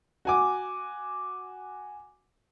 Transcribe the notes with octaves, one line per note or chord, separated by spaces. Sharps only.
F#4 G#5 D6